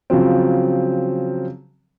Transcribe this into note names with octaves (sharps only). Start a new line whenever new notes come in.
C#3 F3 F#3 C4